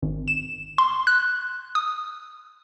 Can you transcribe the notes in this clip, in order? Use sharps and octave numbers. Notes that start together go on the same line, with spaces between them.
G#1
E7
C6
F#6
D#6